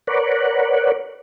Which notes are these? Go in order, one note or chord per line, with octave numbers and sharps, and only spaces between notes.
A#4 B4 C#5 D5 F#5